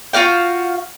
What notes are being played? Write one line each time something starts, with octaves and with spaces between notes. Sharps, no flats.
F4 F#4 F5 G5